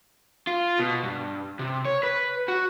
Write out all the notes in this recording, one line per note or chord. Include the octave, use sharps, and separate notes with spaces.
F4
B2
G2
C3
C#5
B4
F#4